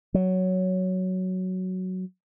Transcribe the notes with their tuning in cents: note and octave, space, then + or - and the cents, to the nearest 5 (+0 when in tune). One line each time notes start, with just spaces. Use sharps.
F#3 +5